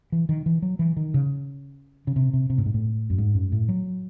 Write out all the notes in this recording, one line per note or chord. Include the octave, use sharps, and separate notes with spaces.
E3
D#3
E3
F#3
E3
D#3
C#3
C#3
C3
C3
C3
A2
G#2
A2
F#2
G#2
F#2
A2
F#3